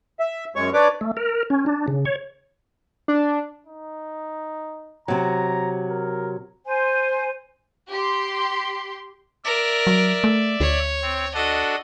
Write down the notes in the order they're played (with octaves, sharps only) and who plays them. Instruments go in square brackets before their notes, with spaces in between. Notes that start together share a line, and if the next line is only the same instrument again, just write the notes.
[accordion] E5
F#2 G#3 C#5 C#6
D4 B4 C#5 D5 D6
[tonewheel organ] A3
A#4
C#4
D4
C#3
C#5
[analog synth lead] D4
[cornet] D#4
[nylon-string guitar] C3 F#3 [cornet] A#5
[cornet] A#4
[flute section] C5 G#5
[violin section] G4 C6
[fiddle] A#4 [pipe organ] D5 E5
[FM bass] F#3
A3
[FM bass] D2 [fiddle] C#5
[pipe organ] C4
[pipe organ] D4 F#4 A4 [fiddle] D#5